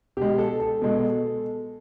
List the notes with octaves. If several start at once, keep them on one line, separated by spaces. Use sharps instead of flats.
B2 G#3 G4
A4
A4
B2 G#3